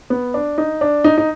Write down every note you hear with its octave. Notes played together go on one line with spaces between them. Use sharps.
B3
D4
D#4
D4
D#4
D#4